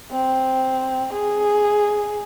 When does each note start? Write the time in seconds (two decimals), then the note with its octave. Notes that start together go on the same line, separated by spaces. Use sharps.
0.11 C4
1.13 G#4